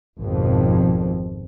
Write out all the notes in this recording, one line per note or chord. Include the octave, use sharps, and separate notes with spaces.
G#1 F2 B2